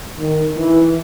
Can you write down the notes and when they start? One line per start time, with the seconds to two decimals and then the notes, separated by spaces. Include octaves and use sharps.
0.19 D#3
0.56 E3